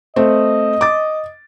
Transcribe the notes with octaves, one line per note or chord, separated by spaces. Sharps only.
A3 C4 D#5
D6 A6